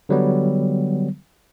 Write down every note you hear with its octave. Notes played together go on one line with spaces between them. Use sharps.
D3 F#3 G3 B3